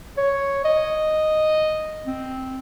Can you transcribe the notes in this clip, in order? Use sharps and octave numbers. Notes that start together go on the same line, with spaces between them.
C#5
D#5
C4